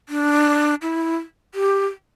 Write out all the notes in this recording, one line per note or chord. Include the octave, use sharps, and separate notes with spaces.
D4
E4
G4